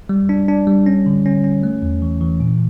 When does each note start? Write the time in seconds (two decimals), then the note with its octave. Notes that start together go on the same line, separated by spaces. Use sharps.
0.09 G3
0.29 D4
0.48 D4
0.67 G3
0.86 C#4
1.06 D3
1.26 C#4
1.44 C#4
1.63 A3
1.82 E2
2.02 E3
2.21 E3
2.40 A#2